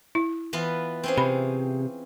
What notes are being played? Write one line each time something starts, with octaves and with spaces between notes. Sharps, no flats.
E4
E3 B3 F4
C4 C#4 G#4
C3 B5